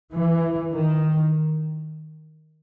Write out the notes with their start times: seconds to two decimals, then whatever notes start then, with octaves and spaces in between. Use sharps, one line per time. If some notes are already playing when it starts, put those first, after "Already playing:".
0.12 E3
0.73 D#3